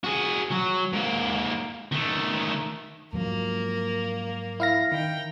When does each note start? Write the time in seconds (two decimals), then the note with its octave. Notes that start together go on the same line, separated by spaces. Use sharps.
0.04 F#4 G#4
0.51 F#3
0.93 G#2 A#3
1.92 D#3 A3
3.13 G#2 F3 F#3 A#3 A#4
4.60 E4 F5 A#6
4.91 D#3 G5 A#5